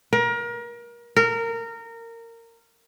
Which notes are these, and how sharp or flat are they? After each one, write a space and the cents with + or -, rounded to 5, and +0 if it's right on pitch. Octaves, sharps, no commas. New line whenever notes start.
A#4 +30
A#4 -20